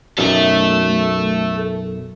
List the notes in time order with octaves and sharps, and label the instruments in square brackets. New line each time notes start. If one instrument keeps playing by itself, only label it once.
[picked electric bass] B1 F#2 [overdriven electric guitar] A4 E5